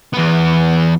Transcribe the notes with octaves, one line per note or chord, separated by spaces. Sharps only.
E2 B3